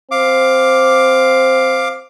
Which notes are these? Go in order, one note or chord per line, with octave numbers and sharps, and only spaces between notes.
C4 F5 D6